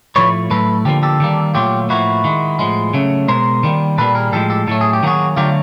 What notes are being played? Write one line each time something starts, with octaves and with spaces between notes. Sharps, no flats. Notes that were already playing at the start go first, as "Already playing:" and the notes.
A2 F3 A3 B4 C#5
A2 F#3 A3 A4 B4
D3 F3 A#3 G4 A4
G4 A4
D#3 G3 A#3
A#2 F#3 A3 F4 G4
A2 F3 A#3 E4 F#4
D#3 G#3
A2 F3 G#3
C#3 F#3 A3
B2 G#3 A#4 C5
D#3 G3 A#3
A#2 G3 A#3 A4 B4
G#4 A#4
A2 F3 G#3 G4 A4
G4 A4
A2 F#3 A3 A4
G#4
G4
D#3 F#3 A#3 F#4 G#4
D3 F#3 A3 F4 G4